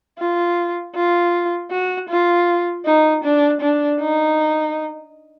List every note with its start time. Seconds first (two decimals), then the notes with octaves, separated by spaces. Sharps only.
0.18 F4
0.95 F4
1.71 F#4
2.09 F4
2.86 D#4
3.24 D4
3.61 D4
4.00 D#4